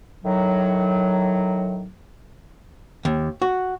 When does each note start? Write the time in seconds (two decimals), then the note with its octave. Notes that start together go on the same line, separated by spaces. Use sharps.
0.24 A2 D#3 F#3
3.05 D#2
3.42 F#4